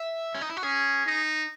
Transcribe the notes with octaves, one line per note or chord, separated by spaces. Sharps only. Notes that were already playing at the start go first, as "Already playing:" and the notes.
Already playing: E5
C#4
D#4
E4
F#4
C#4 G#4
D#4